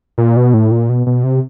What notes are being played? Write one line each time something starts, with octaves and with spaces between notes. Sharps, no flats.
A#2
B2
A2
A#2
B2
B2
C3